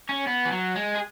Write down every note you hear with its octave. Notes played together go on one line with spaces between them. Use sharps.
C#4
B3
E3
F#3
G#3
G#4